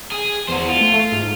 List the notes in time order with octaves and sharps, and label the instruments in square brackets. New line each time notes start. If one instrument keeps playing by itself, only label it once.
[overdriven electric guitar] G#4
[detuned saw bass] E2 [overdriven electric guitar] F#4 C5
[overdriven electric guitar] F4
[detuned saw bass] A3
G#2